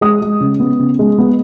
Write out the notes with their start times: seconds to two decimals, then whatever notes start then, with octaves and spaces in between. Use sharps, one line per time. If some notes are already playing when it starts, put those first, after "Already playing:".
0.01 G#3 D#6
0.22 G#3
0.41 C#3
0.60 B3
0.79 C#3
0.99 G#3
1.18 B3